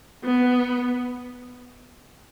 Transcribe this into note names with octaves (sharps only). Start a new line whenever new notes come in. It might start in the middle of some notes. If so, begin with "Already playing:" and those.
B3